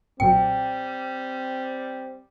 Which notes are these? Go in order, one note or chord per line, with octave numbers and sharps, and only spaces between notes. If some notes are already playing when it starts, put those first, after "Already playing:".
B1 A#2 F#3 G3 C4 G5